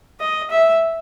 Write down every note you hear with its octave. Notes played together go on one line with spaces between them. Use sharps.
D#5
E5